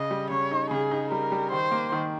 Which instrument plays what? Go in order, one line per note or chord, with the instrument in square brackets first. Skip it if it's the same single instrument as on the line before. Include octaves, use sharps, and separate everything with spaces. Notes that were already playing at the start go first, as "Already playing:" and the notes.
Already playing: [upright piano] C#3 [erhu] D#5
[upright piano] G3
[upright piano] C#3 [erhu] C#5
[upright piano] D#4
[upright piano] C#3 [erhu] G#4
[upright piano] D#4
[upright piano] G3 [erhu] A#4
[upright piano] G3
[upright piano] D#3 [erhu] C5
[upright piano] A#3
D#3